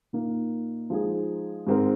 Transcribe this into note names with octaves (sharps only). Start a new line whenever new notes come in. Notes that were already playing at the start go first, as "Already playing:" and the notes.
A#2 A#3 D#4
F3 G#3 D#4 G#4
G#2 G#3 C4 D#4 A#4